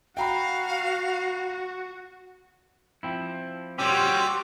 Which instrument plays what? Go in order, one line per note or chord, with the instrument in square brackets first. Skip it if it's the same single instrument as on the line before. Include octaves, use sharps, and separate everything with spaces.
[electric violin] F#4 [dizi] F5 [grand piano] G5 A#5 B5
[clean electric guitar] F3 C4 E4
[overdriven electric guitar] G3 C#4 [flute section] F#4 C6 [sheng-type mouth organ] G5 D6 E6